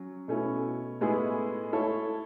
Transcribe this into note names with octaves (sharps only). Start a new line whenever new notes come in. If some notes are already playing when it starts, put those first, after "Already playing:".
Already playing: F#3 C#4
B2 A3 C#4 E4
A2 G#3 B3 E4 G#4
A3 E4 A4 C#5